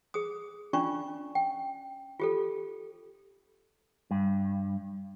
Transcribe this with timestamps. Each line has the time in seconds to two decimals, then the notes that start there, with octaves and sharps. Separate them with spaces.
0.14 G#4 D#6
0.73 C#4 D4 F4 D5 C#6
1.35 G5
2.20 F4 G4 A4
4.11 G2